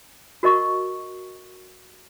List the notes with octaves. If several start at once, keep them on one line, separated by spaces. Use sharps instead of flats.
F#4 A#4 D#5 C#6